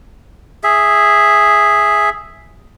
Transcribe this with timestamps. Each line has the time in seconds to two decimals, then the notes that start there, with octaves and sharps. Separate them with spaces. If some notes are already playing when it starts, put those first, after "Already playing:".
0.64 G#4 E5